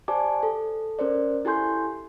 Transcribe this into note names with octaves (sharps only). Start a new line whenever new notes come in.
G4 C5 D5 G#5 A5 D6
A4
C#4 A#4 C5 D5
E4 G4 A4 G#5 C6 G6